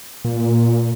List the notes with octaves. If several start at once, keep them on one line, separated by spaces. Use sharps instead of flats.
A#2